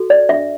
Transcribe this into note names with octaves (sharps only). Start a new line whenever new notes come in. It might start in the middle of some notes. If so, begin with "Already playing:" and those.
Already playing: F#4 A4
D5
D4 E5